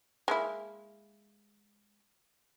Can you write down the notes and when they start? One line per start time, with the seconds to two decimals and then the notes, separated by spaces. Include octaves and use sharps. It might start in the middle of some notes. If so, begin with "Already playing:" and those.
0.28 G#3 A#3 E4